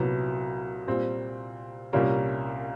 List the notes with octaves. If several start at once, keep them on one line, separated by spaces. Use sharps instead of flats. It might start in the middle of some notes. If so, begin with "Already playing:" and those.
Already playing: C2 A#2 F#3 B3 E4
A#2 G3 C4
C2 A#2 G3 A#3 C#4